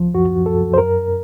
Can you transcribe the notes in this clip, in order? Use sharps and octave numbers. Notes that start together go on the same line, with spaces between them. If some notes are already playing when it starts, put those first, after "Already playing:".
Already playing: C#2 F3
F#2 F#4
F#2 A4
C5
F#2 A#4